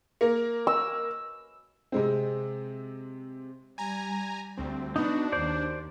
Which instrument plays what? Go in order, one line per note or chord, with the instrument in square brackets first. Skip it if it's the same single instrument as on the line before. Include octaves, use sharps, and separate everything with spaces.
[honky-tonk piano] A#3 A#4
[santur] E6
[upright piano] C3 G#3 C4
[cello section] G3 [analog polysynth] G#5 A#5
[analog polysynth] D2 C4 [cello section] G3
[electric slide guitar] B3 D#4 [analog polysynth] D4 [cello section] F#4
[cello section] D#2 [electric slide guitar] C5 D5